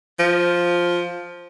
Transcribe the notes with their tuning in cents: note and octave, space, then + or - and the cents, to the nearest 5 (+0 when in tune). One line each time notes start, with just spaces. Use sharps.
F3 +5